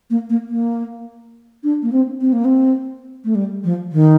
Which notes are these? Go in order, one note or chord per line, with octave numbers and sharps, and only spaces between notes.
A#3
A#3
A#3
D4
A#3
C4
C4
A#3
C4
A3
G3
F3
D#3